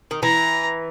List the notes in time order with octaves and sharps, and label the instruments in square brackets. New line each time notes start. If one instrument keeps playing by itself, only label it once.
[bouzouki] D#3
[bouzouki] E3 [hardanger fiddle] A#5